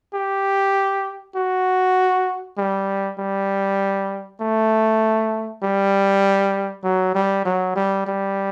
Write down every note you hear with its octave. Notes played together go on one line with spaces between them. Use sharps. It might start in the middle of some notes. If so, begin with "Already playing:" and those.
G4
F#4
G3
G3
A3
G3
F#3
G3
F#3
G3
G3